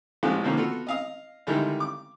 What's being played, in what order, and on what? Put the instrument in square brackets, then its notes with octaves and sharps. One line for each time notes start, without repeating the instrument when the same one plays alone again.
[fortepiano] A1 F3 G#3 G4 F#6
B2 D3 D#3 F3 A#3 C#4
B3 F4 F#4 A4
D#5 F5 D#6
D3 D#3 G3 G#3 D#4 E4
D6